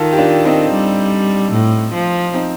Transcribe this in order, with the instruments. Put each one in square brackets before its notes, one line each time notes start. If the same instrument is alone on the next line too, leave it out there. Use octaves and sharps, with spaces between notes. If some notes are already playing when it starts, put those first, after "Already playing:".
Already playing: [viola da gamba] D#3 [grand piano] F4 A4
[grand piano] G4
D4 F4
C4 D#4
[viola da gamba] G3
A2
F3
[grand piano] C4 D#4